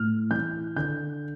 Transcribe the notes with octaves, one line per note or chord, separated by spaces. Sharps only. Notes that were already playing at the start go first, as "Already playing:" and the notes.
Already playing: A2 F6
E3 G6
D3 G6